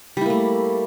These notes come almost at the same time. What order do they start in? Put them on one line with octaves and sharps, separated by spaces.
G3 E4 A#3 A3